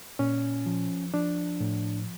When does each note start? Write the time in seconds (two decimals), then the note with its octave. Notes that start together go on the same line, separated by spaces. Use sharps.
0.19 A#2 C#4
0.66 F3
1.14 F3 D4
1.60 A2